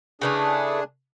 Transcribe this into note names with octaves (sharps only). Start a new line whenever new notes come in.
C#3 E3 A3 D4 G#4